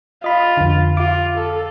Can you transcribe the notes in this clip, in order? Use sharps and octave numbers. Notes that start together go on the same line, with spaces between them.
F4 D#5 B5
F2 D3
F4 D6
A4